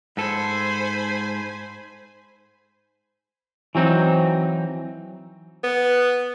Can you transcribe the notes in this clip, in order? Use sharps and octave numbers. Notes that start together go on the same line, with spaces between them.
G#2 A4 C5 G#5 B5
E3 F#3 C4 D#4
B3